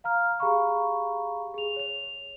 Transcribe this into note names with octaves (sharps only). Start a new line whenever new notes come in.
F5 A#5 F6
G4 G#4 F5 A#5 B5 C#6
G#4 F7
C#5 F7